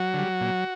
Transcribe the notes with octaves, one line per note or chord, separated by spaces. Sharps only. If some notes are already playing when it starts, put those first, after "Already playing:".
Already playing: F#3 F#4
D3 G3
A#2